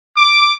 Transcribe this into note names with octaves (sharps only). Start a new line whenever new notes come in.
D6